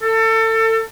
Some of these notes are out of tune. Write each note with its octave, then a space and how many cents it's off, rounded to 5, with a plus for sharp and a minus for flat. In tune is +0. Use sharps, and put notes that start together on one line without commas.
A4 +30